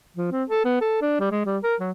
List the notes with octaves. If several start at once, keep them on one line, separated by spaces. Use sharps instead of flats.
F3
C4
A4
B3
A4
D4
G3
G#3
G3
A#4
F#3